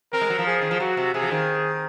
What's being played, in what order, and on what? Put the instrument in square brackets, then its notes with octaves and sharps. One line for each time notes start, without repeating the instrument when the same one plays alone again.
[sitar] C4 [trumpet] A#4
[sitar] G#3
F#3
F3
[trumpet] G#4
[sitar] D#3
F3
[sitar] F#3 [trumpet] F#4
[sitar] C3
[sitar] C3 [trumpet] G#4
[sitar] F3
D#3